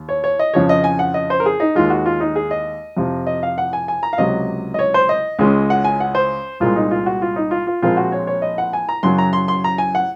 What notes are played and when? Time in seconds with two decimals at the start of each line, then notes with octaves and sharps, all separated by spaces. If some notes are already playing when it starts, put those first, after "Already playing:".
Already playing: D#2
0.09 C#5
0.24 C#5
0.39 D#5
0.54 F2 C#3 F3 C#5
0.69 D#5
0.84 G#5
0.99 F#5
1.14 D#5
1.30 C5
1.40 A#4
1.46 G#4
1.60 D#4
1.75 D#2 D#3 G#3 F4
1.90 F#4
2.06 F4
2.20 D#4
2.36 G#4
2.51 D#5
2.97 F2 C3 F3
3.27 D#5
3.43 F5
3.58 F#5
3.73 G#5
3.88 G#5
4.03 A#5
4.13 F5
4.18 C#2 C3 F#3 D#5
4.74 D#5
4.79 C#5
4.94 C5
5.09 D#5
5.39 C#2 C#3 G#3 C#4
5.70 F#5
5.84 G#5
6.00 F#5
6.15 C5
6.60 C2 A#2 G#3 F4
6.76 D#4
6.91 F4
7.06 F#4
7.22 F4
7.36 D#4
7.51 F4
7.67 F4
7.82 A#1 A#2 G#3 C4 F4
7.97 F#4
8.12 C#5
8.27 C#5
8.42 D#5
8.58 F#5
8.73 G#5
8.89 A#5
9.03 F#2 C#3 F#3 C6
9.18 A#5
9.33 C6
9.48 C6
9.64 A#5
9.78 G#5
9.95 F#5